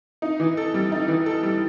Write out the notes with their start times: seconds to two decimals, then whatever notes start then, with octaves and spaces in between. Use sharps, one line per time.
0.22 D#4
0.40 E3
0.57 A4
0.74 G3
0.92 D#4
1.08 E3
1.26 A4
1.43 G3